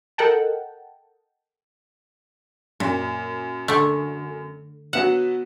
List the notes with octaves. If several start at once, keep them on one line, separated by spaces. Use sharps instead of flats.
A4 A#4 D#5 F#5 G5 A5
F#2 A#2
D3 A3
F#3 B3 F#5 E7